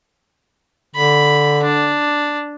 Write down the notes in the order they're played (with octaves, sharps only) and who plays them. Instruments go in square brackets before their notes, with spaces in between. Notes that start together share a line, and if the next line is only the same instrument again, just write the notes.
[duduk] D3 [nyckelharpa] B5
[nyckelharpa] D4